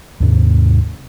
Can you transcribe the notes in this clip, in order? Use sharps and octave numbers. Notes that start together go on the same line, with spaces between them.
D#2 G#2 C3